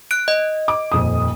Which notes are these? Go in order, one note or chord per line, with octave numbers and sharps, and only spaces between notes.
F#6 D7
D#5
D6
D#1 F2 D#6